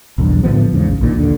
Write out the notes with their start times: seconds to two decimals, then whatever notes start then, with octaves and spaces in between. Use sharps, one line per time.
0.18 B1 E2 G2
0.43 A2 D3 F3 B3
0.73 E2 G#2 C#3
0.88 A#1
1.01 A#1 A#2 D#3
1.16 D#2 D3